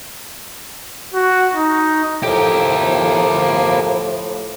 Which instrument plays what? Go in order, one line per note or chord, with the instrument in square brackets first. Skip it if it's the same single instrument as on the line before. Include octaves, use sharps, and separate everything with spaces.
[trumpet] F#4
D#4
[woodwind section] A2 F3 [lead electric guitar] G4 A#4